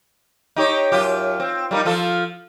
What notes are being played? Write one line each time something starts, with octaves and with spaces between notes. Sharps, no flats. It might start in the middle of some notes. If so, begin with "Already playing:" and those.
D#4 G4 C#5
F#2 F4 G4
C4
G3 A#3 D#4
F3 F4 A4